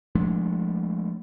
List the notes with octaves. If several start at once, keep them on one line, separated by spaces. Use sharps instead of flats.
F3 G#3 A3 D4